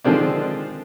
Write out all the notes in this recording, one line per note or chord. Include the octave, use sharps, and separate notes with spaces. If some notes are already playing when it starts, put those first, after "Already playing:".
D3 D#3 F3 G#3 C4 D4